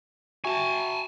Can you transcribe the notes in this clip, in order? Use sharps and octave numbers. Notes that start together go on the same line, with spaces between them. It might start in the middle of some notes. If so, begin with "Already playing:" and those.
F#4 E5 G#5 A5 C#6